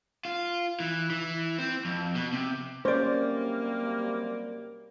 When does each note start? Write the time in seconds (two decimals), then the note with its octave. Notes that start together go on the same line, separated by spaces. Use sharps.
0.25 F4
0.80 E3
1.10 E3
1.58 C4
1.85 F2
2.16 B2
2.32 C3
2.85 C3 F#3 G3 A#3 C#4 C5 D5